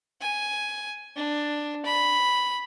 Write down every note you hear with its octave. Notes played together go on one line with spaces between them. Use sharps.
G#5
D4
B5